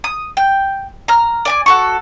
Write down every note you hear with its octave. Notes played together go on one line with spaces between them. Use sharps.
D#6
G5
A#5 F6
D5 G#5 D6
F#4 A4 C#6